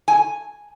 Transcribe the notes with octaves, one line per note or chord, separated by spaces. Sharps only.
G#5